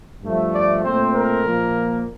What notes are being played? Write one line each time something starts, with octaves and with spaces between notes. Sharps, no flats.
G2 F3 A3
D5
A#2 A3 C4 C5
A#4
A#2 F3 A#3